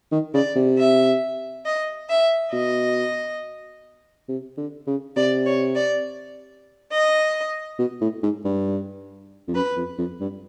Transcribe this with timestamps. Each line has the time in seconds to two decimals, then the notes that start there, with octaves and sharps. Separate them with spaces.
0.12 D#3
0.34 C#3 D5
0.56 C3
0.78 E5
1.65 D#5
2.09 E5
2.52 B2 D#5
4.28 C3
4.58 D3
4.87 C#3
5.16 C3 D5
5.45 C#5
5.74 D5
6.91 D#5
7.79 B2
8.01 A2
8.23 G#2
8.45 G2
9.48 F2
9.54 F#2 B4
9.76 F2
9.98 F2
10.20 G2